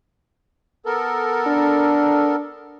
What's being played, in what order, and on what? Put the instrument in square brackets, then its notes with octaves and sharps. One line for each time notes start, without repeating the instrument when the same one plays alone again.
[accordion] B3 A4 A#4
[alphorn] D4